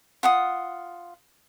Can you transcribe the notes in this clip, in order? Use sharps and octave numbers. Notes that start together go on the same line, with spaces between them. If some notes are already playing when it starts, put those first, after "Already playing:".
F4 F#5 D#6